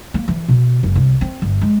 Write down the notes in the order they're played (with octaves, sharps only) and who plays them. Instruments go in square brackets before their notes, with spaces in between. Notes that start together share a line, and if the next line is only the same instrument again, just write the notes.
[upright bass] A#3
E3
B2
F#1
C2
C4
G1
G#3